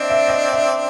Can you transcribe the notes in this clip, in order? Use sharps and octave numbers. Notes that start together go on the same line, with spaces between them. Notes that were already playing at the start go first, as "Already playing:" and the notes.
Already playing: C4 D4 D#5 E5
E5
D#5
E5